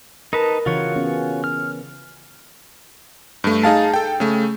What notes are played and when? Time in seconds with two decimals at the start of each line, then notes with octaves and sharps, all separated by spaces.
0.33 D#4 A#4 B4 A5
0.66 C#3 E3 F4 F#4 C#5
0.96 B3 C#4
1.44 F6
3.44 G2 A3
3.63 D#4 G#4 F5 A5
3.94 A4 G5
4.20 C#3 A3